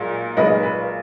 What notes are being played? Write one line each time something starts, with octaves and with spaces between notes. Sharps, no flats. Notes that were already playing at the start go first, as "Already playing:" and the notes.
Already playing: B1 A#2 G#3
B1 A#2 G#3 B4 D#5
B4